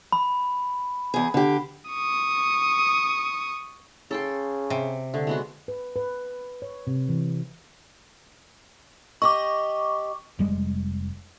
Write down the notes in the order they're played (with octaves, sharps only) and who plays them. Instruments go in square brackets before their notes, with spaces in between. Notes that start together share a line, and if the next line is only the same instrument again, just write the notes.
[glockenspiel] B5
[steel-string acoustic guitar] E2 G#4
D3 G4
[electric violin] C#6 D#6
[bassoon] C#3 [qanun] A4 G5 C6
[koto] C3
[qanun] D3 [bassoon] A3
[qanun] G#3 B3 F#4
[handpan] B4
B4
C#5
C3
E3
[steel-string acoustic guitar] G4 D#5 [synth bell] C#6 D6
[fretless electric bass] F1 G3 G#3